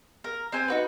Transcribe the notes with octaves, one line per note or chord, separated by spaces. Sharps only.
A#4
C4 C5 G#5
D#4 F#4 B4